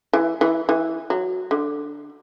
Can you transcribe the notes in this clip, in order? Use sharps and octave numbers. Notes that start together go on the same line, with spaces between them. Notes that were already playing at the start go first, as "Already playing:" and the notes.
E3
E3
E3
F#3
D3